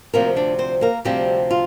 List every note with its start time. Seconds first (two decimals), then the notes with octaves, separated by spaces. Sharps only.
0.14 D2 C3 F3 A#3 C4 A#4
0.36 D4 D5
0.59 C4 C5
0.81 A#3 A#4
1.05 D2 C3 F3 G3 C4 G4
1.51 F4